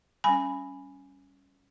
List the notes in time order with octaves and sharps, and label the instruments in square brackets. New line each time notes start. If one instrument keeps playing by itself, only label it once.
[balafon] G3 C#4 G#5 B5